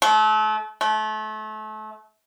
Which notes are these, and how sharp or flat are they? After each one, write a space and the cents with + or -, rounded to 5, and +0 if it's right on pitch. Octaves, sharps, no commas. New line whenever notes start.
A3 -35
A3 -30